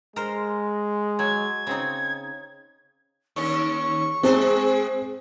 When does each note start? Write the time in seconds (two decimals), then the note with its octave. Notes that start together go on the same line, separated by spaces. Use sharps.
0.16 G#3 A#4 C5
1.19 F#3 G#6
1.67 C#3 C4 D#4
3.36 D#2 C#4 C#6
4.23 G#3 C4 G#4 C5